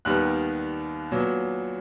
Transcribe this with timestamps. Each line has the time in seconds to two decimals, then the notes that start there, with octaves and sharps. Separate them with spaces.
0.05 D#2 D#3 G3 B3 F#6
1.12 A#2 F#3 B3